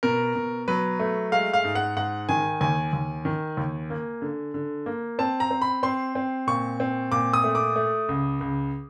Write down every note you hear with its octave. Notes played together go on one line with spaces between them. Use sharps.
B2 A#4
B2
F#3 B4
A3
G#3 F5
F5
G#2
F#5
G#2 F#5
D#3 G#5
D#2 G#5
D#2
D#3
D#2
A#3
D3
D3
A#3
C4 A5
A#5
C4
B5
C4 C6
C4
A#2 C#6
C4
A#2 D6
D#6
A3
D6
A3
C#2
C#2